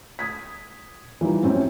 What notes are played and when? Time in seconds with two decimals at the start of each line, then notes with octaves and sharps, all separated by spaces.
0.19 D#6 G#6 B6
1.21 E3 F3 G3 D#4
1.43 F#2 A2 C4 C#4